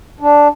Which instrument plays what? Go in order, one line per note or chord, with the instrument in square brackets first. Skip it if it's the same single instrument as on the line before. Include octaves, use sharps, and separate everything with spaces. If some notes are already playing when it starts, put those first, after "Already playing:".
[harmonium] D4